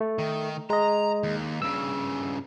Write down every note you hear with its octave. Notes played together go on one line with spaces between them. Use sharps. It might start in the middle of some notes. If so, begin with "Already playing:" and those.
A3
D#3
G#3 D#5 A#5
D#2
G2 C#3 E6